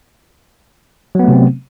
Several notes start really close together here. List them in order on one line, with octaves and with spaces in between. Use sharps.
F#3 B3 A3 C3 C4